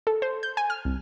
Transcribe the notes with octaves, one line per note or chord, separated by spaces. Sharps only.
A4
C5
G6
G#5
F6
C2